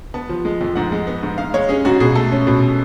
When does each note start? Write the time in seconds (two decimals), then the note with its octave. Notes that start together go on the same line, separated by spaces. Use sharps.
0.14 B3 A5
0.29 F3
0.45 G#3
0.61 F2
0.76 G#2 F#5
0.92 G#3
1.07 B3
1.23 G#2
1.38 G#2 F5
1.54 G#3 C#5
1.69 C#4 G#4
1.85 G#2 F#4
2.00 B2 G#4
2.15 A3 A4
2.32 C#4
2.47 B2